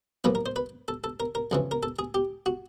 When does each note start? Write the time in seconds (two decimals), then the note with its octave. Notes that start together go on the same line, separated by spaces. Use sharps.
0.24 B1 A#2 F3 B4
0.35 A#4
0.46 C5
0.56 B4
0.88 A4
1.04 A4
1.20 A#4
1.35 A#4
1.51 F2 C#3 E3
1.71 A#4
1.83 A4
1.99 G#4
2.14 G4
2.46 F#4